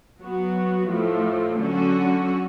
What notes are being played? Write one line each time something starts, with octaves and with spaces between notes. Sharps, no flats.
F#3 B3 F#4
A2 F3 A3
D3 F#3 C#4 F#4